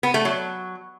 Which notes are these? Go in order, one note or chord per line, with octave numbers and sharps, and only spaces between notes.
B3
A3
F#3